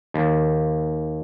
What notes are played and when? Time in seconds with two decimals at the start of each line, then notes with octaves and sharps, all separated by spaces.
0.14 D#2